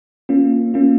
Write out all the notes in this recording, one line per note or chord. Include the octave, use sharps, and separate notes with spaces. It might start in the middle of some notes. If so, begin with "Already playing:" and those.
A#3 C#4 F4
A#3 C#4 F4